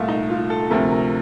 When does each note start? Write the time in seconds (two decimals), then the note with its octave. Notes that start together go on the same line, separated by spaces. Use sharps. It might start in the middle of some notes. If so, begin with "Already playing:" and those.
Already playing: C2 A#2 A3 F4
0.09 D#4
0.30 F4
0.50 A4
0.70 D2 C3 F3 A3 A#4
0.91 A#4